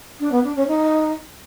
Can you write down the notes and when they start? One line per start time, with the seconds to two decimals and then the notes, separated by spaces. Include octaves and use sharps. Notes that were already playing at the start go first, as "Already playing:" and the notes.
0.20 D4
0.32 B3
0.44 D4
0.55 C#4
0.67 D#4